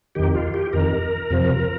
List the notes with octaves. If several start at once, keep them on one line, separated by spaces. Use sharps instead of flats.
F2 D#3 G4
F4
G4
F2 D#3 A#4
F2 C3 F3